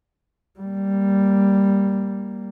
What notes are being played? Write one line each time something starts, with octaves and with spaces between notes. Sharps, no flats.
G3 A#3